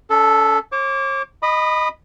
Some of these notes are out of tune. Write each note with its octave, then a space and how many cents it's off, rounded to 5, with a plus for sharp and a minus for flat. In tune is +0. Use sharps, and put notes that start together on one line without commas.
C#4 +40 A4 +0
C#5 -45 D6 -20
D#5 +0 B5 +0 D#6 -30